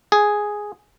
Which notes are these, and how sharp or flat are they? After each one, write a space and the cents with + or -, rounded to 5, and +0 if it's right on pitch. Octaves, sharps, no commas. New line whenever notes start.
G#4 +0